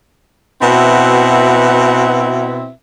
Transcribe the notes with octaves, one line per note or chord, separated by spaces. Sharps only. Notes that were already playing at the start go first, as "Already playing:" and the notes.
B2 C4 E4 F#4 B4 E5